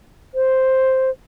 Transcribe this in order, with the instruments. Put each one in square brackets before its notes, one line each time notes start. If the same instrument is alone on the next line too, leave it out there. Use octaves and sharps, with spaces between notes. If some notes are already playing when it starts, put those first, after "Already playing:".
[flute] C5